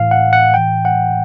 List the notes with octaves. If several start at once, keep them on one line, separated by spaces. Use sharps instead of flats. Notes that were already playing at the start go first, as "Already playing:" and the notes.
Already playing: A2 E3 F5
F#5
F#5
A2 E3 G5
F#5